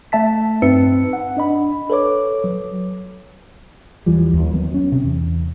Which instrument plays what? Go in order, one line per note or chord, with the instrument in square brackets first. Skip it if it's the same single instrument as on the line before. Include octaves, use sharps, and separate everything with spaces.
[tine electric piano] A3 E5 A5 B6
G2 C4 D#4 B4 E6 C#7
F#5
D4 D#5 B5
A4 B4 C#5 D6
F#3
[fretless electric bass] E2 E3 F3 G3
D#2
F#3 A3 B3
C#4
C3
E2